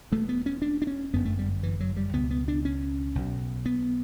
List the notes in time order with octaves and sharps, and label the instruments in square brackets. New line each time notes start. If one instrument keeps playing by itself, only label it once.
[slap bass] E1 E2 B2 A3
B3
C#4
D4
D4
C#4
G1 F#2 D3 B3
A3
G3
E3
F#3
G3
C#2 B2 B3
B3
D4
C#4
B1 B2
B3